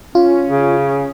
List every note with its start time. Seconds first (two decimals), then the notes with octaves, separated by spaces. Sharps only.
0.15 C#4 F4
0.50 C#3